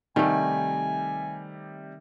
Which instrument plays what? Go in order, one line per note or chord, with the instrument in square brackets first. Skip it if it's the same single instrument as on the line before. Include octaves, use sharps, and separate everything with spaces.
[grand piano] C3 G3 [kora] D#3 A3 [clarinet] G#5